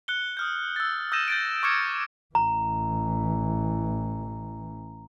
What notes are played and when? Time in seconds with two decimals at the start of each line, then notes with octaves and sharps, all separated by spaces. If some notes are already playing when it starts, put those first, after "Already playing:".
0.08 F#6 C#7 G7
0.37 D#6 F6 G6
0.76 E6 A6
1.12 D#6 E6 G6 A#6 D#7 E7
1.28 G6 A6 D7
1.63 C#6 D6 F6 G#6 C#7
2.35 A1 E3 A#5